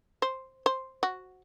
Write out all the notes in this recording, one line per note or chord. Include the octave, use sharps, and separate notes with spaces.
C5
C5
F#4